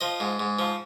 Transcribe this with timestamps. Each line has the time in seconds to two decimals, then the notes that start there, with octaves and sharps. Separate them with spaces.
0.01 F3 D#5
0.20 G#2
0.39 G#2
0.59 F3